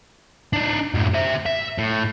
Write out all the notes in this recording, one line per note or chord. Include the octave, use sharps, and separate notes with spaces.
D4 D#4
F#2 A2
C5 E5
E5
A2